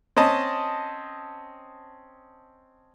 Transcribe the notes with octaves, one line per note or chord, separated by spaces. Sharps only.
C4 C#4 D#5 A5